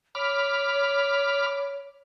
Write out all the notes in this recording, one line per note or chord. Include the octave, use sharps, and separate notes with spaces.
C#5 B5 D6 F6